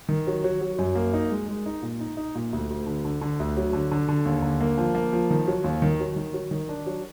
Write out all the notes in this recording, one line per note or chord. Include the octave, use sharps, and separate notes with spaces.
D#3
F#3
F#3
F#3
F#2
A#3
D#4
G#3
G#3
D#4
A#2
D#4
D#4
A#2
D2
D2
D3
D3
D3
D2
F#3
D3
D3
D3
D#2
D3
A#3
F3
A#3
F3
D#3
F#3
D#2
D#3
F#3
D#3
F#3
D#3
D4
F#3